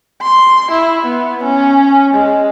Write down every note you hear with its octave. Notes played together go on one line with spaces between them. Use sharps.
C6
E4
B3
C#4
G#3